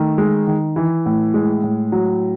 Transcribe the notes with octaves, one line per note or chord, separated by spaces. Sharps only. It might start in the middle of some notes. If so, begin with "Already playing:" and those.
Already playing: D#3 A3
G#3
D#3
E3
A2
G#3
A2
F#3